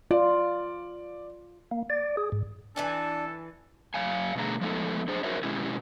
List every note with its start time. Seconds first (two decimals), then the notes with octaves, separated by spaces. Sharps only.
0.11 F4 D5
1.71 A#3
1.90 D5
2.17 G#4
2.32 G#2
2.76 E3 D4 A4 B4 G#5
3.94 F#2 F5 G#5
4.36 B2 D3 A3 G#4 A#5
4.61 F3 G#3 A3 B3 D#4 A4
5.08 D4 G#4 C5
5.23 D#4 F#4 A#4 C5 C#5 E5
5.43 B2 G#3 C#4 E4 G4